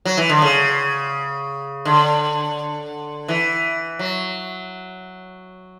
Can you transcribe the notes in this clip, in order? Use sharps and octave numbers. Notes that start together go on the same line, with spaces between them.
F#3
E3
D3
C#3
D3
E3
F#3